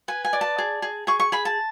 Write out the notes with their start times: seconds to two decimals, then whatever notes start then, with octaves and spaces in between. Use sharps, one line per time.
0.08 B4 G#5
0.25 G#5
0.33 D5
0.41 A5
0.58 G#4
0.82 G#4
1.07 G#4 C#6
1.20 C#6
1.32 G#4 B5
1.45 A5